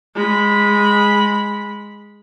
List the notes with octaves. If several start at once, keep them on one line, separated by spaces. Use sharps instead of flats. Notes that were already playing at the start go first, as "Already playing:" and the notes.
G#3 B5